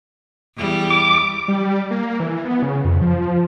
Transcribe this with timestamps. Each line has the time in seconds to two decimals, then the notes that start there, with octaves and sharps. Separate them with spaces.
0.56 E2 G3
0.90 D6
1.48 G3
1.91 A#3
2.20 E3
2.45 B3
2.63 C#3
2.85 F2
3.01 F3